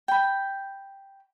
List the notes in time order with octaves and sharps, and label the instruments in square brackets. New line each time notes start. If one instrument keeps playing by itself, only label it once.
[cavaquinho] G5 B5